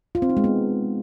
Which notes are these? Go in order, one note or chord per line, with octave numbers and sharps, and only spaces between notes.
F4
C4
D#4
G#3
B3